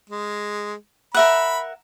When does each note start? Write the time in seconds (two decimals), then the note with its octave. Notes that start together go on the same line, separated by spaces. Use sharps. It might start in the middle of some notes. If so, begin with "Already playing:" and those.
0.10 G#3
1.14 A#4 E5 F#5 B5